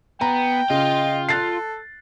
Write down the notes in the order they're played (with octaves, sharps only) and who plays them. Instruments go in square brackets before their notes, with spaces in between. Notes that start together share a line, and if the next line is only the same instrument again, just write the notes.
[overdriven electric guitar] B3 [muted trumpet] G5 [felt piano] A#5
[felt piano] C#3 [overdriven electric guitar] F4 [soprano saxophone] D#5
[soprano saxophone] A4 [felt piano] F#6 A6 C7